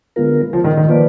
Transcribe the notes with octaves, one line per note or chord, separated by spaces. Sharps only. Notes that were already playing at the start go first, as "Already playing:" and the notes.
D3 G#3 B3 F4 A#4
F3
D#3
D#3
F3 A#3 F4 B4 D5